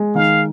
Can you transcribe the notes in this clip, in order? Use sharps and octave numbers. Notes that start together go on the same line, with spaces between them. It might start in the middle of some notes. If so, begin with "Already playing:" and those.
Already playing: G#3
D#3 F5